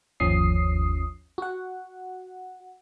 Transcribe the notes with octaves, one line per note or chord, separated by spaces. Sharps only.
G1 D#2 F3 C#4 D#6 C7
F#4 F#5